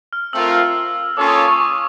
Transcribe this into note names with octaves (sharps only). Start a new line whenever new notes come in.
F6
A3 C4 F4 A#4 E6
A#3 C#4 F4 A4 C#5 D6
D#6
D6
C#6
D6